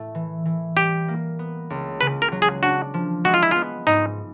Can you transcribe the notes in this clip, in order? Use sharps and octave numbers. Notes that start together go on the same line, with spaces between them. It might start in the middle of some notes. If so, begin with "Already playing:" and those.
Already playing: A2 A3
E3
E3
G3 G4
A#3
B3
C#2
C#3 B4
A#4
F#3
G#4
D4 F#4
F3
G#3 F#4
F4
E4
B3 F4
G#2 D#4